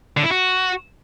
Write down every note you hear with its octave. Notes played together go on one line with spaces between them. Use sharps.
D3
E4
F#4